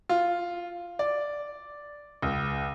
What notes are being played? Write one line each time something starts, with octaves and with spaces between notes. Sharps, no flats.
F4
D5
C#2